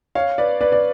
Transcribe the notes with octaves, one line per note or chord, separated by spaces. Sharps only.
C#5 F5
B4 D5
B4 D5
D5